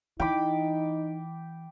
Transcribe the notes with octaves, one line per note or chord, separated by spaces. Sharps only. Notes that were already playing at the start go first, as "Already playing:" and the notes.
E3 D#4 G5 B5 D6